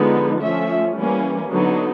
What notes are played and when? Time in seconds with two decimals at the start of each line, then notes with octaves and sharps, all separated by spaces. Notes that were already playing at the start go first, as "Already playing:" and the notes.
Already playing: D3 F3 G#3 B3 D#4
0.41 F3 A3 C#4 E5
0.96 E3 G3 A#3 C#4
1.50 D3 F#3 B3 D#4